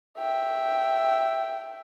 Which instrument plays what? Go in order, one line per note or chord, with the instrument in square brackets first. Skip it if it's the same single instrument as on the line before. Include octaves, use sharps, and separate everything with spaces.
[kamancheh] E5 G5